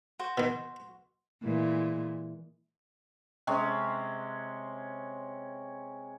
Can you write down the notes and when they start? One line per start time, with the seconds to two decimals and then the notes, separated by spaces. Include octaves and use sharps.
0.19 F#4 C5
0.38 B2 D#3
1.43 A#2 E3 G#3
3.47 C3 G#3 C#4